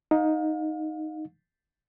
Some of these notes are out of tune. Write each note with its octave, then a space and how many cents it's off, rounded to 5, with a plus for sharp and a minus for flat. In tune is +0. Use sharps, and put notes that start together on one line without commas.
D#4 +0 F5 +35